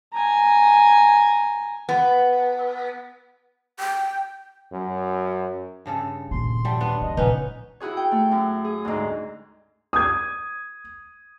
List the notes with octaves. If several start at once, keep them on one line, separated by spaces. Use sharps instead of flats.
G#5 A#5
B3
G5
F#2
G2 C#3 A4
D#2 A#2 C6
F#3 G3 A3
B3 D4
A3 D#5
C#2 A#2 B3 C#4 D#4 B4
E4 F#4 G#4 C#5
G5
A3
F#2
G#4
D2 G#2
D#6 G#6